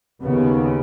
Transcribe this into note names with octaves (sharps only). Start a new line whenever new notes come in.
D#2 C#3 B3